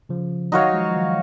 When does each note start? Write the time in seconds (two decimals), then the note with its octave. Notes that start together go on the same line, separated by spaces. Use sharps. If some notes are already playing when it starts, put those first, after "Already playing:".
0.09 C#3 F3
0.52 D#3 F#3 D#4 F#4 C#5 F5
0.73 F3 G#3
0.89 F3
0.94 D#3 F#3